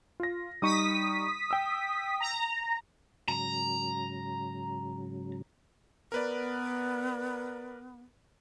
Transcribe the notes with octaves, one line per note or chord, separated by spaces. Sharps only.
F4 A#6
G3 D#4 C#6 D#6 B6
G5 E6
A#5
G#2 C#3 F#3 A#5
B3 A#4 B4 D5